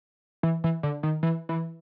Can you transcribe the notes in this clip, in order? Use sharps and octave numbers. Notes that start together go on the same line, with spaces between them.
E3
E3
D3
D#3
E3
E3